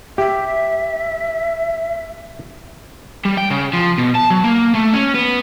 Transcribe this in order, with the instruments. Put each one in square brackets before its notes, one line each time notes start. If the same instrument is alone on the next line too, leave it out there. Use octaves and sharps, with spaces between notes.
[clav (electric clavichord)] G4 [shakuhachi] E5
[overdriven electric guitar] G3
G5
C#3
F3
B2
A5
F#3
A#3
A3
C#4
B3